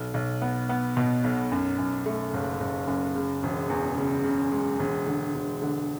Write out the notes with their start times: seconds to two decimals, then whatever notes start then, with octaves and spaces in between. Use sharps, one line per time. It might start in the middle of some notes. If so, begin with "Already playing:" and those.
Already playing: B1
0.14 B1
0.42 B3
0.69 B3
0.97 B2
1.24 B1
1.52 F#2
1.78 F#2
2.06 A3
2.34 F#1
2.60 F#1
2.88 F#2
3.15 C#3
3.43 E1
3.70 E2
3.97 C#3
4.24 C#3
4.52 G#3
4.79 E1
5.06 D3
5.34 E1
5.62 D3